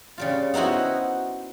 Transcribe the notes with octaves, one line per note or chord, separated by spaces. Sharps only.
C#3 G3 F4
B3 D#4 E4 F#4 C5